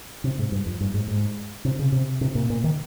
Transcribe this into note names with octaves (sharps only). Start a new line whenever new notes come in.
C3
G#2
G2
F2
G2
G#2
G#2
C3
C#3
C3
C3
A#2
A#2
D#3